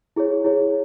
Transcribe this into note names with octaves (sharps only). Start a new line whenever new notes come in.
E4 G#4 C#5
E4 G#4 C#5